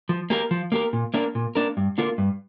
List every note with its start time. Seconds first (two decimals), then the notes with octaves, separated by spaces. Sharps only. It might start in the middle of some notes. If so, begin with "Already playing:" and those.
0.09 F3
0.30 A#3 G4 A#4
0.51 F3
0.72 A#3 G4 A#4
0.93 A#2
1.14 A#3 D4 A#4
1.35 A#2
1.55 A#3 D4 A#4
1.77 G2
1.98 D3 A#3 F4 A#4
2.18 G2